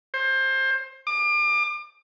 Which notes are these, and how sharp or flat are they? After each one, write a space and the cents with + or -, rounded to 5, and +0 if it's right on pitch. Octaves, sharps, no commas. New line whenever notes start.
C5 +20
D6 +35